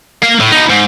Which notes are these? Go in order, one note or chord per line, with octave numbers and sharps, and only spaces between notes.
A#3 F5
A2
B3 D#4
G#2